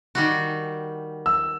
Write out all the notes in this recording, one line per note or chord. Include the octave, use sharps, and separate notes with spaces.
D#3 G3 F#4
E6